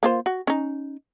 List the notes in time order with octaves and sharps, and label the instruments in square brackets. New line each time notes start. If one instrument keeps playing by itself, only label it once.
[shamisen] A#3 F4 C5
F#4
C#4 D#4